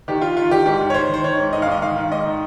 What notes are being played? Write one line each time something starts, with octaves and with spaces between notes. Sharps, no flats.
D#3 G4
D#3 F4
D#3 F4
D#3 G4
G#2 G4
D#3
C#5
D#3 C5
D#3 C5
D#3 C#5
G#2
D#3 D#5
F5
G#2 D#5
D#3 F5
D#3
G#2 D#5
D#3